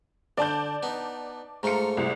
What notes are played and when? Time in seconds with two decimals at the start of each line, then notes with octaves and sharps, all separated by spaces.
0.38 D3 D5 A5 G6
0.83 B3 D#4
1.63 G#2 A3 F4 A#5 C#7
1.97 C2